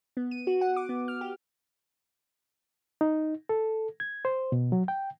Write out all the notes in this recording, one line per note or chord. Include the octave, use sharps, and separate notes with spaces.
B3
D#7
F#4
F#5
D6
B3
F6
G4
D#4
A4
G#6
C5
B2
F#3
G5